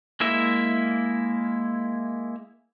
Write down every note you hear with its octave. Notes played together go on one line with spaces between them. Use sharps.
G#3 A#3 E4 E5